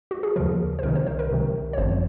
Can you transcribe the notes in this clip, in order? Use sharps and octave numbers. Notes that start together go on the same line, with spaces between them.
F#4
G#4
D#2 C#3 F3 A#4
C5
C2 C3 D#3 A#4
C5
C5
A#4
C2 C3 D#3
C#5
G#1 F#2 F3 C5